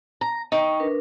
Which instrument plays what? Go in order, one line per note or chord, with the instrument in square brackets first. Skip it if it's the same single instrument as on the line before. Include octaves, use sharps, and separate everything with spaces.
[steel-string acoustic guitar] A#5
[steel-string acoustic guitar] D#4 [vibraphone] G5 C#6
[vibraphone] D4 A#4 B4